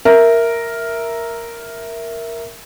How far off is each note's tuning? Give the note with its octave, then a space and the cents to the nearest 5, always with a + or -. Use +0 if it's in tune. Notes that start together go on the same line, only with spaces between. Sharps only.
A#4 +0 E5 +0